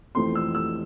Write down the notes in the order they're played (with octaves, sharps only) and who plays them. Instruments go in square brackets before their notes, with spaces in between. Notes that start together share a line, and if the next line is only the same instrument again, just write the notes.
[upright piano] F2 E3 A3 C4 C6
E6
E6